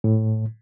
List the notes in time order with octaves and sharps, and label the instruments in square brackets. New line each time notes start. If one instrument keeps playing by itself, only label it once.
[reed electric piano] A2